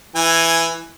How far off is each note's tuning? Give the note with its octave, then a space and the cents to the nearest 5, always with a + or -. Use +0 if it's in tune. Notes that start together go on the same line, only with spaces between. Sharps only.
E3 +5 G#5 +0